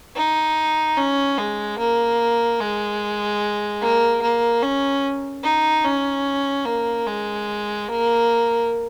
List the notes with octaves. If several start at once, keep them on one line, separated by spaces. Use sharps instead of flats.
D#4
C#4
G#3
A#3
G#3
A#3
A#3
C#4
D#4
C#4
A#3
G#3
A#3